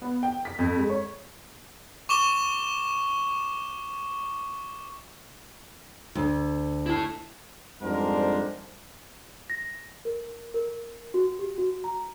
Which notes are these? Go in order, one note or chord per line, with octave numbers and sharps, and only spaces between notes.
B3
G5
B6
F2
G#3
C#5
C#6 D6 E7 G7
D2
E4 A5
F2 G#2 G3 D4 A#4 C5
A#6
A#4
A#4
F#4
G4
F#4
A#5